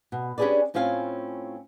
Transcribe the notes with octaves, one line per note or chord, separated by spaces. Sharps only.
B2
C#4 D4 G4 G#4 B4 D5
A2 C4 C#4 F4 F5 G#5